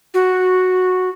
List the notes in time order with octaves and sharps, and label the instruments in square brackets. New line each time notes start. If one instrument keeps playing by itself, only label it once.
[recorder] F#4